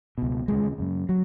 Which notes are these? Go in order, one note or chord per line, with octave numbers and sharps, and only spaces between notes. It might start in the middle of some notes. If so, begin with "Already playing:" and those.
C#2 B2
D#2 C#3 G#3
F#2 C#3
F#3